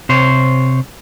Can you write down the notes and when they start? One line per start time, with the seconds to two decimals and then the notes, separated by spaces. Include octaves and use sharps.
0.09 C3 C5 C#5